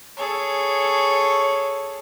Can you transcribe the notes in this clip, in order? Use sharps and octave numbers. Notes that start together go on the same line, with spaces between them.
G#4 A4 C#5